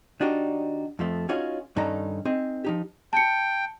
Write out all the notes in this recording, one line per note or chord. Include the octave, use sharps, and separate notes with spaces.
D#3 D4 D#4 F#4 G4
F2 F3 A3
C#4 D#4 F4 F#4 G#4 C#5
G2 D#3 C#4 D#4 A4 A#5
C4 D#4 G#4 D#5
F3 D#4 G4
G5 A5 C#7